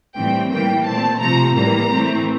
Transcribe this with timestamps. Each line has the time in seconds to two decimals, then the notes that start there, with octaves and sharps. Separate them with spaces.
0.16 A2 E3 G3 C4 G5
0.51 E3 G3 A#3 G5
0.86 A#2 A3 C4 A5
1.21 C3 F3 C4 A#5
1.56 A2 E3 G3 A#3 A#5
1.91 E3 A3 C4